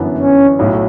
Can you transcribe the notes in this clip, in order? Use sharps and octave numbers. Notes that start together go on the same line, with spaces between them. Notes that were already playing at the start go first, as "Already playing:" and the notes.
Already playing: G1 F#2 E3 B3 D4
C#4
B1 A2 F#3